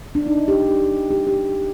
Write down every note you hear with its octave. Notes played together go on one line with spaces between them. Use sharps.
D4
D#4
G4
G4
G4